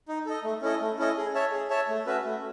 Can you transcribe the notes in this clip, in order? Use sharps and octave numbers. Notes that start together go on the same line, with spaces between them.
D#4
A4 D#5
A3
C#4 E4 A4 D#5
A3
C#4 E4 A4 D#5
G#4
C#5 E5 A5
G#4
C#5 E5 A5
A3
C#4 F#4 B4 E5
A3